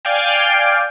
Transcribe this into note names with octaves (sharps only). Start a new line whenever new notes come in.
D5 F5 G5 G#5